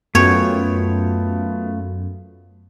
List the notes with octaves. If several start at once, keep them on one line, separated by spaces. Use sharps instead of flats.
F#2 A3 B3 F4 C#5 G5